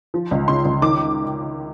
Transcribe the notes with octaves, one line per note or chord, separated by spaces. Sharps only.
F3
C#2
C#3 C6
C#2
D#3 D6